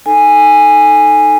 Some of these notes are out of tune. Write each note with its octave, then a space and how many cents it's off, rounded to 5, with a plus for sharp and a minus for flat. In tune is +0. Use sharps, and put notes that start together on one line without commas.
D#4 +0 A4 -10 G#5 -10